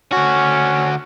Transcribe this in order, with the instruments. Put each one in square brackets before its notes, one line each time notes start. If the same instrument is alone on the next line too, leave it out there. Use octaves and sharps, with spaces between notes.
[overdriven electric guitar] D3 F#4 [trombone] C#4